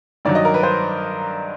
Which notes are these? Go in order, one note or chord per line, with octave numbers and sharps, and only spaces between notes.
G2 D#3 F#3 D5
D#5
A#4
B4
C5